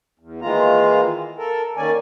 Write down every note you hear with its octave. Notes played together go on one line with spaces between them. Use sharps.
E2
D#3 E3 G#3 A#3 F4 A#5
A4 A#4
D#3 A#3 C#4 D5 G#5